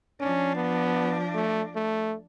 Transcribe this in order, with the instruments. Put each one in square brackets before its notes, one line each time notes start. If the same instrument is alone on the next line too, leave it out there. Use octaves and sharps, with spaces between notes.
[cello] F3 D4 [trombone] C#4
[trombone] B3
A3
A3